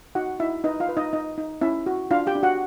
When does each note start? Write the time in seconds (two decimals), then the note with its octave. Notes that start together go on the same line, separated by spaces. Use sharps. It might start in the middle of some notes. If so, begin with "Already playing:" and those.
0.15 D#4 F#4 F#5
0.40 D#4 E4 E5
0.64 D#4 B4 D#5
0.80 F4 F5
0.89 B4
0.97 D#4 D#5
1.13 D#4 D#5
1.38 D#4
1.61 C#4 E4 E5
1.86 F#4
2.11 D4 F4 F5
2.27 G4 G5
2.35 D4
2.43 F#4 F#5